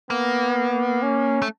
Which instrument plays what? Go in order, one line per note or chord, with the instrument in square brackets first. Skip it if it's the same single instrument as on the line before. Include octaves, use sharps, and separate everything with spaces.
[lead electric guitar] A#3 [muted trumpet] B3
[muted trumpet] C#4
[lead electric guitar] A3